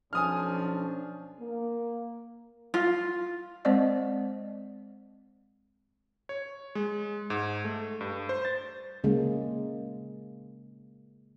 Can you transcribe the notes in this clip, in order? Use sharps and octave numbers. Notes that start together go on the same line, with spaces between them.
B1 F3 C#4 D4 G#5 D#6 F6
A#3
F4
G#3 C4 C5 D5 D#5
C#5
G#3
G#2
A3
G2
C5
A6
C#3 G#3 A#3